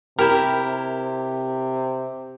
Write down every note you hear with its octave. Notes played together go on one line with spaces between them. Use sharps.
C3 E4 G4 A#4